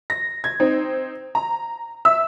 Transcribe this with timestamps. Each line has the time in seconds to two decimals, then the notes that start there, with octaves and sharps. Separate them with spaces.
0.10 A#6
0.44 G#6
0.60 C4 D#4
1.35 A#5
2.05 E5 E6